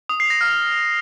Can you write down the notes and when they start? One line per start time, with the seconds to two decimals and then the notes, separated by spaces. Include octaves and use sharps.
0.09 D#6
0.20 C7
0.30 A#6
0.41 F6